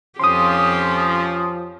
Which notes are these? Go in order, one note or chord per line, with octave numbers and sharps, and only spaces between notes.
F2 F3 C#4 G4 C6 D#6